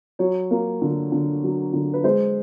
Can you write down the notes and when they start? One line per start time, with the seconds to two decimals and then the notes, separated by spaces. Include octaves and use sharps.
0.19 F#3 C#5
0.51 A#3
0.82 D3
1.12 D3
1.44 F#3
1.73 D3
1.94 B4
2.04 G#3 C5